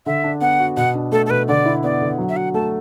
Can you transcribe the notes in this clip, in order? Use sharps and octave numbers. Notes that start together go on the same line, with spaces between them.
D3 E5
D4
B3 F#5
F#4
B2 F#5
D4
A3 A4
A4
B2 B4
D3 D5
E4
B3 D5
D3
F#3
E5
F#4 F#5
A3 A5